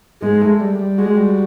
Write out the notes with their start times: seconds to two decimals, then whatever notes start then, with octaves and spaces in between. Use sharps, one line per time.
0.22 G#2 G#3
0.42 A3
0.60 G3
0.79 G3
0.98 G#3 F#4
1.17 G3